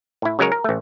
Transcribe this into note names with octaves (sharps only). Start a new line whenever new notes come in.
A2 E4
C#3 F#3 G#3 A#4 C#5
A#4
A1 A3